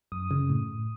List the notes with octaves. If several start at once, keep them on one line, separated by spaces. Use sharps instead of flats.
F#2 D#6
C#3
A2